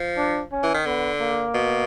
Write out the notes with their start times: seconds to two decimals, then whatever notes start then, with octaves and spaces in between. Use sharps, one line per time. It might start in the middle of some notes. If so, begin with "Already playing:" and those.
Already playing: F3
0.17 D4
0.52 C#4
0.63 E3
0.74 D#3
0.86 D3 B3
1.21 A#3
1.54 B2